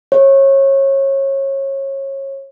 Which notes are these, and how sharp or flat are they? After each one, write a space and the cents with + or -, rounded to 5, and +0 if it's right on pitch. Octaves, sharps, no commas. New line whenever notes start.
C#5 -25